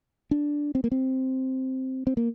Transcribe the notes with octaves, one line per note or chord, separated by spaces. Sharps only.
D4
C4
A#3
C4
C4
A#3